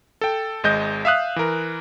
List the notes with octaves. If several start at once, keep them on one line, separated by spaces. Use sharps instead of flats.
A4 G5
G#1 G#3 D#5 G6
E5 F5 D#6 F#6
E3 A#4